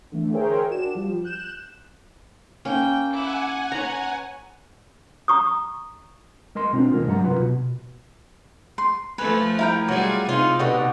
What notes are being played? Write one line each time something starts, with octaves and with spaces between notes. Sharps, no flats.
D3 E3 A3
G#4 A#4 C5 C#5 E5 G5
D4 F#4 E7
F3 G3
F#6 G6 E7
A#3 C#4 G5
E4 F#5 G#5 D6
B4 C#5 A#5
A#5 C#6 D#6
G#3 A#4 D#5 C6
B2 C4 D4 F4
D#2 A#2 G#3 A#4
G2 F#3 F#5 A#5
C2 F4 B4
B2
C6
F3 A3 B4 G#5
E4 A#4 G5
F#3 G3 F4 F#4 G#4
C3 D#4 F4
B2 D3 G4 D#5